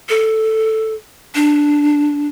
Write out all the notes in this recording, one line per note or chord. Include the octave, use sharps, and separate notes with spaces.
A4
D4